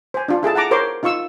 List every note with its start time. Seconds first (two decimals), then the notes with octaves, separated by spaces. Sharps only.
0.14 C5 G#5
0.28 D4 F4
0.43 E4 G#4 A4 A5
0.55 F#5 A5 A#5 D6
0.71 A#4 C5 C#5 C6 D6
1.03 D#4 F4 F5 C#6 E6